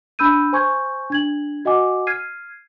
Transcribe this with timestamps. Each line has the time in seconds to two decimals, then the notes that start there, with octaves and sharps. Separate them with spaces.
0.19 D4 B5 E6 G6 D#7
0.53 C5 G#5 C6 C#6 G6 G#6
1.10 D4 G#6 F#7
1.65 F#4 D#5 F#5 G#5 D6
2.07 F6 G#6 C7 D#7